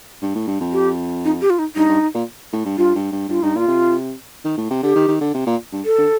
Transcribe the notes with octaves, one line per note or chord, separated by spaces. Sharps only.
G2
A2
G2
F2
G4
D#4
G4
F4
D#4
G2 D#4
G2
A#2
A2
G2
G2 F4
G2
G2
G2 F4
G2 D#4
A#2 F4
C3
D#3
A2
C3
D3 G4
D#3
D#3
D3
C3
A#2
G2
A4
D3